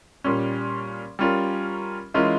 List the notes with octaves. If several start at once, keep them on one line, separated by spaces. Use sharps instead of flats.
A#2 G3 C#4
G3 C#4 F4 A#4
E3 G#3 C#4 F4 A#4